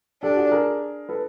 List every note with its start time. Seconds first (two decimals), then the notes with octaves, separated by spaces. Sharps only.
0.23 D4 G4 A4
0.37 F#4 G#4
0.51 G#4 A#4
1.09 A4 B4